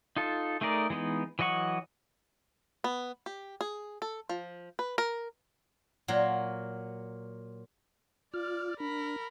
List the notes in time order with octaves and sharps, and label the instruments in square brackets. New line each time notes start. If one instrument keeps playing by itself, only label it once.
[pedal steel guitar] D#4 F4 A4
A3 D#4 G#4 A#4 D5
E3 G#3 B3 D#4
E3 F#3 D#5 F#5 C#6
[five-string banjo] B3
G4
G#4
A4
F3
B4
A#4
[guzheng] A#2 F#3 F#4
[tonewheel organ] F4 F6 [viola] D5
[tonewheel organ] D4 [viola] A#4 B5